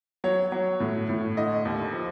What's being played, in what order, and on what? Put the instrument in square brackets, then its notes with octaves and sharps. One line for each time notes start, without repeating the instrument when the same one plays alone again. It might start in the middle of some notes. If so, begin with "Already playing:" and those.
[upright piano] F#3 C#5
F#3
A2
A2
D3 D#5
D#2
F3